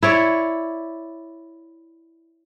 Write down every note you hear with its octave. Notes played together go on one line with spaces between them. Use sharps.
E4 C#5 D5